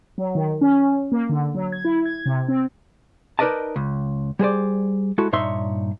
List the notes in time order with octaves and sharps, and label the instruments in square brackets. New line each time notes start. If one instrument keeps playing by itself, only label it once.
[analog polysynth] F#3
D#3
C#4
A#3
D3
F#3
G#6
E4
G#6
C3
C4
[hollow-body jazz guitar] D#4 A#4 B4 D5 D#5 A5
C#2
G3 G#4 C5 D5
G#3 E4 F#4 A4
G2 A#2 D#4 C#5 E5 C6